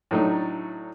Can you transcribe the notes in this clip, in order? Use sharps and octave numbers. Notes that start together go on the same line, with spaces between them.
A2 F#3 A3 D4 D#4